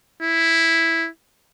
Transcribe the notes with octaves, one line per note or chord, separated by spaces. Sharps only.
E4